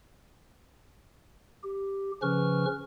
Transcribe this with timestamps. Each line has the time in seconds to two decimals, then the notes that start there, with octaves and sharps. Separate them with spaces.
1.64 G4
2.22 C#3 F3 C#4 B4 C#6 F6